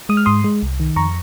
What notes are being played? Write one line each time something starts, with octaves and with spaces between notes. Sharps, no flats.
G#3 D#6
F6
G#2 C6 D#6
G#3
C2
D#3
F2 A#5 C#6